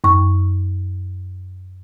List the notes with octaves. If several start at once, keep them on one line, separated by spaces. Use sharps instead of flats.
F#2 C#6